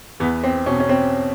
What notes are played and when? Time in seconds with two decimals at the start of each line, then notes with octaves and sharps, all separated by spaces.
0.20 E2 B3
0.44 C4
0.66 B2 C#4
0.80 C#4
0.89 C4